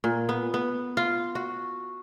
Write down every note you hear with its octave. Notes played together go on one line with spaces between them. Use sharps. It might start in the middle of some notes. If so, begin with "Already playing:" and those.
A#2
B3
B3
F4
F#4